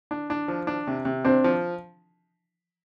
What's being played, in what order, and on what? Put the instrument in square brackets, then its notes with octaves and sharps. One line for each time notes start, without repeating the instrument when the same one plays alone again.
[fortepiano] D4
D4
F3
D4
C3
C3
[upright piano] C4 [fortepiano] D4
[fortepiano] F3